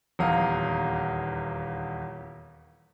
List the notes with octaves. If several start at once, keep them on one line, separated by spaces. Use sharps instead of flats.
D#1 E2 F5 A#5